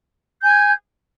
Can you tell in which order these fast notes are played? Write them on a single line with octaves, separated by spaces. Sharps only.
G6 G#5 G#6